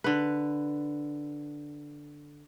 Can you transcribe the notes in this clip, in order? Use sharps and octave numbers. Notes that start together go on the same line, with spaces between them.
D3 B4